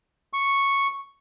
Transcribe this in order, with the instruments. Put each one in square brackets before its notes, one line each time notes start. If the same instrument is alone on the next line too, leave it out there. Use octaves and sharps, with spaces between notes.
[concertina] C#6